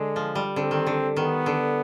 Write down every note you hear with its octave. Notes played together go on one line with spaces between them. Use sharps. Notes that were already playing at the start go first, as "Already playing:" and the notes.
Already playing: D3 G#3
F3
G3
D3 C4
D#3
D3
D#3 B3
D3